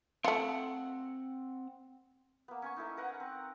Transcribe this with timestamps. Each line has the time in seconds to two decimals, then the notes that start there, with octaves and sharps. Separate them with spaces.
0.24 A3 C4 F4 F#5
2.48 A#3 B3
2.62 C#4 G#5 C#6
2.76 D#4 E4 A4
2.97 A#4 B4 F5 F#5
3.20 C4